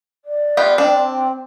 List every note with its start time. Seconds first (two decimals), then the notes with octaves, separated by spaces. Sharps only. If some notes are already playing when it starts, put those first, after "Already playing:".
0.25 D5
0.57 B3 F4 G4
0.78 C4 D4